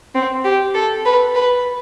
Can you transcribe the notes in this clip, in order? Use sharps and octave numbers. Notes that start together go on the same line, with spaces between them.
C4
G4
A4
B4
B4